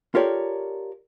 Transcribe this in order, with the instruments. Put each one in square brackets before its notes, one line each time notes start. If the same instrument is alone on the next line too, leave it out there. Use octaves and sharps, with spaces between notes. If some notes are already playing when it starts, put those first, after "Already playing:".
[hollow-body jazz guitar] F4 G4 A4 A#4 C#5 D5